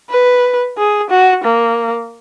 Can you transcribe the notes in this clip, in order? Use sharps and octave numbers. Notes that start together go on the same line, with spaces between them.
B4
G#4
F#4
A#3